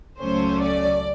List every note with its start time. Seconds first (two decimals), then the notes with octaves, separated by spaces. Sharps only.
0.20 C#2 C#3 F#3 A3 C#4 C5
0.62 D5